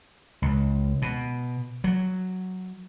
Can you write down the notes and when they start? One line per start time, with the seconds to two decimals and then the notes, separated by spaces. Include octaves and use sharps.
0.42 C#2
1.02 B2
1.84 F#3